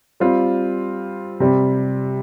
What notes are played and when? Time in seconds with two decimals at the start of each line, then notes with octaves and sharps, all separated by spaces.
0.20 G3 C4 F4
1.40 C3 G3 C4